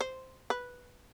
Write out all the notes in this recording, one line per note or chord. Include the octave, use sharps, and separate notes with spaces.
C5
B4